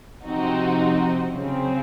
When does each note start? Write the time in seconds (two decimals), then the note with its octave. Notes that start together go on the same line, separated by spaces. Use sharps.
0.24 C3 F3 C4 D#4 F#4
1.32 C#3 F#3 C4